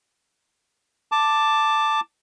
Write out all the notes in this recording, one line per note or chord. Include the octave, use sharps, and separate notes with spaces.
A5 D6